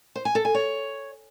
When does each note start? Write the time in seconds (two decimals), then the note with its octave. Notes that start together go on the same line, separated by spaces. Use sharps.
0.16 C5
0.25 G#5
0.35 A4
0.45 G#5
0.55 C#5